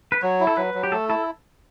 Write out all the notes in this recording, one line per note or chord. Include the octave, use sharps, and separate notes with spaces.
B4
F#3 C#5
E4
A4
F#3 B4
F#3
G4
A3 A4
E4 A4